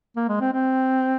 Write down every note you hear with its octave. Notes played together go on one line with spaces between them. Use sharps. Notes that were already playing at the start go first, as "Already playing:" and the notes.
A#3
G#3
C4
C4